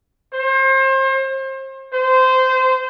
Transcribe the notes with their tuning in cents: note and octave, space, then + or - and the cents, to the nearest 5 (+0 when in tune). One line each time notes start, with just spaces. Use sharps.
C5 +35
C5 -20